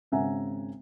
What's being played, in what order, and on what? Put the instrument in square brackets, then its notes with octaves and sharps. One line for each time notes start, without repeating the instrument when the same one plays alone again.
[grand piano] G#1 C#3 E5 F#5 G#5 A#5